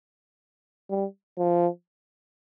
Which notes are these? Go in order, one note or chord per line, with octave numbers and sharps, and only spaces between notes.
G3
F3